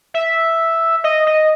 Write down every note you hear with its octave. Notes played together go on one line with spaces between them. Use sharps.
E5
D#5
D#5